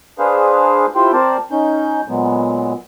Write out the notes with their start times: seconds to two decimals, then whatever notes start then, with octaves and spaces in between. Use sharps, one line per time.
0.19 D4 G#4 B4 C5 F5
0.95 E4 F4 G4 C5 G5
1.13 C4 A#4 C5 D5 A5
1.51 C#4 D#4 G6
2.08 A#2 F#3 G#3 B3